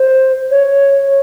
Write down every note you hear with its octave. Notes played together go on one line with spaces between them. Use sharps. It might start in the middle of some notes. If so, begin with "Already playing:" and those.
Already playing: C5
C#5